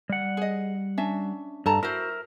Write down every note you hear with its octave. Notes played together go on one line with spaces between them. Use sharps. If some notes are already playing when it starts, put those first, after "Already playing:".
G3 F#5
G#4 D#5
C#4 D4 E5
G2 A4 A5 A#5
E4 F#4 A#4 C5 E5